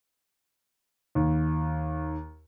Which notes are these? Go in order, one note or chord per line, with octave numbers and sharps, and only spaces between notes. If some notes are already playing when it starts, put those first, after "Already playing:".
D#2